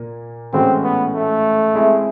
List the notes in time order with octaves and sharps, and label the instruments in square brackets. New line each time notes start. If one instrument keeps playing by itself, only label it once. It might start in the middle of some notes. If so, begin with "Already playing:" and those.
Already playing: [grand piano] A#2 A#3
[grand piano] A2 E3 G#3 C#4 F#4 [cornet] C4
[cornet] B3
A3
[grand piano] G#3 C4 E4 G#4